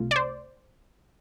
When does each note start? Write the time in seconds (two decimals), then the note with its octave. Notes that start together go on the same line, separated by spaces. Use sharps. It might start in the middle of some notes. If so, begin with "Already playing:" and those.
Already playing: C2 C3 A3 F4
0.11 D5
0.16 C5